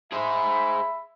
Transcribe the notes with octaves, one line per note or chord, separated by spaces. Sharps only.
G#4 C5 E5 B5